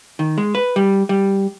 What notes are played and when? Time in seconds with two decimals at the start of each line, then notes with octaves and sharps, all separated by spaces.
0.19 D#3
0.38 G#3
0.55 B4
0.76 G3
1.09 G3